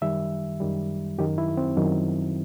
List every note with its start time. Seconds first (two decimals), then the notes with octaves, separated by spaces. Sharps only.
0.01 F#2 D#3 G3 E5
0.60 F#2 D#3 G3
1.18 F#2 D#3 F#3 G4
1.38 E4
1.57 C4
1.76 F#2 D#3 F#3